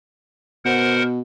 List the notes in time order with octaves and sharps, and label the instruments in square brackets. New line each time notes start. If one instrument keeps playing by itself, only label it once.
[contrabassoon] B2 [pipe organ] A#4 C5 F#5